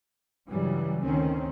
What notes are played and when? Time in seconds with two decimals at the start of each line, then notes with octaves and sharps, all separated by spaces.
0.49 G2 C#3 E3 F#3 G3
1.03 D2 D#3 C4 C#4